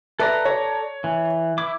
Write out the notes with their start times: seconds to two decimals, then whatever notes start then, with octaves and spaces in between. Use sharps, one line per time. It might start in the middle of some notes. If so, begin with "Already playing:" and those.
0.20 A4 B4 D5 E5 A#5
0.45 C#5
1.04 E3
1.58 E4 D6